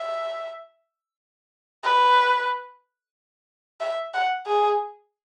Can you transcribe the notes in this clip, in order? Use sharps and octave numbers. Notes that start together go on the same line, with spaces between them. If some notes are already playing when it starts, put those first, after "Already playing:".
Already playing: E5
B4
E5
F#5
G#4